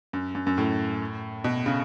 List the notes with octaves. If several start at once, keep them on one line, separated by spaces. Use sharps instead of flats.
F#2
F#2
F#2
A2
B2
C#3